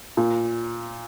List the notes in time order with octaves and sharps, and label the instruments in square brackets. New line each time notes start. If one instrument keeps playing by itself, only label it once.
[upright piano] A#2